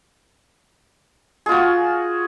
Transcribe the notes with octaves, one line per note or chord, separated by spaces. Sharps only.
F4 F#4 G#4